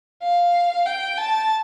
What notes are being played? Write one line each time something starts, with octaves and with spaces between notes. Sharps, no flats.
F5
G5
A5